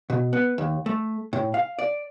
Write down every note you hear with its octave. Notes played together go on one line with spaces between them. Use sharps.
B2
B3
D#2
A3
A2
F5
D5